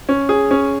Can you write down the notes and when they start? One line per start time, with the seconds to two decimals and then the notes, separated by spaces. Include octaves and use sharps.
0.09 C#4
0.29 G#4
0.51 C#4